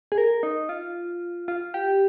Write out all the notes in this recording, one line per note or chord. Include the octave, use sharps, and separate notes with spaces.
G#4
A#4
D#4
F4
F4
G4